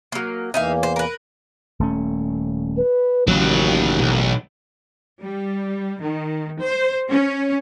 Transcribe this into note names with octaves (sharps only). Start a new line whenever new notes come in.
F#3 A#3
E2 E3 A#3 D#4 E5 F5
C5
A#4 B4
D#1 A3 C#4
B4
A1 D#2 C#3 F#3
B1
G3
D#3
C5
C#4